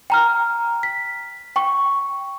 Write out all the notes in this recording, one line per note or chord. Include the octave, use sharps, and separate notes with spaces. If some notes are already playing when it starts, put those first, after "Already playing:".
G5 A#5 F6
B6
G5 C#6